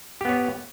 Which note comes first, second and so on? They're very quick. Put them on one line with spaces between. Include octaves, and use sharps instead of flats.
G4 B3 C#5